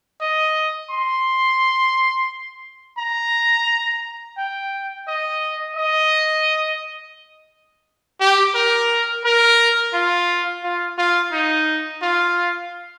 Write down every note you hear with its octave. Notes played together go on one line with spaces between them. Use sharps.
D#5
C6
A#5
G5
D#5
D#5
G4
A#4
A#4
F4
F4
F4
D#4
F4